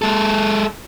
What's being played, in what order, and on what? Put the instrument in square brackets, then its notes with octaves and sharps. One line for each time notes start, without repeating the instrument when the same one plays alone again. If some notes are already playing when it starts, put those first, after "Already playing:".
[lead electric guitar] G#3 A4